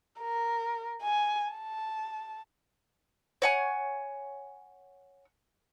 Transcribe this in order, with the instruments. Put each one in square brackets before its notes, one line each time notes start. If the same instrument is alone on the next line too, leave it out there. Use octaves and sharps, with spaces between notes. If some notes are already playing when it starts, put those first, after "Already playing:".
[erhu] A#4
G#5
A5
[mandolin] C#5 F#5 G#5